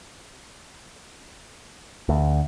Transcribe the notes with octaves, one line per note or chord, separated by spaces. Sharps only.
D2